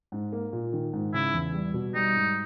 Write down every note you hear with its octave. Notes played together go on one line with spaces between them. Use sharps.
G#2
A#3
A#2
D#3
G#2
C#3 E4
E2
G3
B2
G3 D#4
G#2